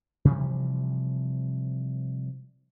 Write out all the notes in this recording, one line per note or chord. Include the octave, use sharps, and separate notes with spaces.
C3 E3 F3 G3